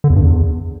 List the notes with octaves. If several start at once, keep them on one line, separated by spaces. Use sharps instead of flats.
D3
E2
G2
E2